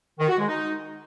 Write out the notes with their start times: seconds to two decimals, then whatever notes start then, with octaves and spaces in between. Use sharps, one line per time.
0.19 D#3
0.29 F#4
0.38 G#3
0.48 D#4